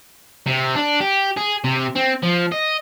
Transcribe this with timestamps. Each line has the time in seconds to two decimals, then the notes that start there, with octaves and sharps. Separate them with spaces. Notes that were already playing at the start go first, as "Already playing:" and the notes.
0.46 C3
0.75 D4
1.00 G4
1.37 G#4
1.64 C3
1.96 C4
2.23 F3
2.52 D#5